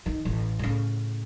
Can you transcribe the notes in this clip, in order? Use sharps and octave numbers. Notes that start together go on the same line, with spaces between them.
D#3
A1
A2 C#3